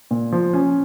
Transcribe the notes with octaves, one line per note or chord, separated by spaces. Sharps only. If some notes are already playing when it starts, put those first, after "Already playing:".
A#2
F3
C#4